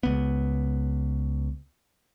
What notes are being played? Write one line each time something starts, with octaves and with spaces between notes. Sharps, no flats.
C#2 B3